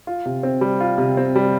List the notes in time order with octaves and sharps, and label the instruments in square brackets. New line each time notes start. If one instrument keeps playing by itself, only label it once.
[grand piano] F4
C3
C4
G3
F4
C3
C4
G3